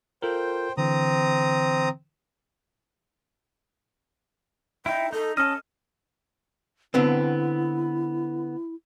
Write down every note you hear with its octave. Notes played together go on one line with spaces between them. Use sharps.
F4 A4 A#4 C5 G5
D3 E3 C4 A#5 D#6
D#4 E4 G5
D#4 A4
C#4 A4 D#5 F6
D3 B3 C4 E4